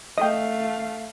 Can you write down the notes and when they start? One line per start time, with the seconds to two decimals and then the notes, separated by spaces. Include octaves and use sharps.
0.18 A3 D#5 F5 G5